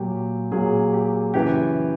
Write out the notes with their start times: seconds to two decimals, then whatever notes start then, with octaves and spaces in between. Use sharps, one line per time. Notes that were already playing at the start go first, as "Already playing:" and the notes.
Already playing: A#2 F#3 A#3 G4
0.51 A#2 F#3 A#3 G#4
0.93 G4
1.34 F#2 C#3 E3 G4